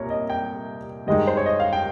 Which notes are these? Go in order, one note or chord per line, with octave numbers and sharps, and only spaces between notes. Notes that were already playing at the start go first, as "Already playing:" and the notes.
Already playing: C2 A#2 A#3 A#4 C#5
D#5
G5
G2 D#3 G#3 D#4 D#5
C5
C#5
D#5
F5
G5